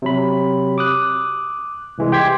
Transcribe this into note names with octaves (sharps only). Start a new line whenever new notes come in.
C3 F#3 B5
D6 D#6 F#6
C2 E3 G#3
G4 G5 C6 G#6 B6